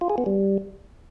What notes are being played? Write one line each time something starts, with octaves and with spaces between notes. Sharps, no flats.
F4
G#4
B3
G3